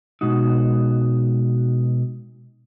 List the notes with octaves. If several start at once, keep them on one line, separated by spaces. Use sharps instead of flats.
B2 G#3 D#4 F#4